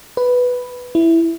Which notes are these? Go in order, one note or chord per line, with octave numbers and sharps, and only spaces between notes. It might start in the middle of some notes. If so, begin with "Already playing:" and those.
B4
E4